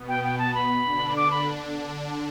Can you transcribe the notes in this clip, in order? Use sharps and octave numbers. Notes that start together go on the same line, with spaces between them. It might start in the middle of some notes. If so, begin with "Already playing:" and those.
Already playing: B2 B3
G5
G5
A5
B5
D3 D4
D6
B5